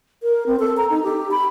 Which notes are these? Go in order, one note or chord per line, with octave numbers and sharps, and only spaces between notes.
A#4
C4
A4
A#5
D#4
G4
B5